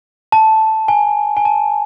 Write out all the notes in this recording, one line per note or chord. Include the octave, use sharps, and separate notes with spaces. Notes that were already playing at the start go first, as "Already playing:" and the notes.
A5
G#5
G#5
A5